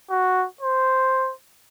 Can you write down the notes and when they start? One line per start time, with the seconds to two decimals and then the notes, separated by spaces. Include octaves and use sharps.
0.10 F#4
0.61 C5